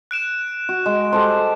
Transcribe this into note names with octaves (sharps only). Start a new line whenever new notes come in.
F#6 D7 E7
F#4
G#3
G4 A4 C5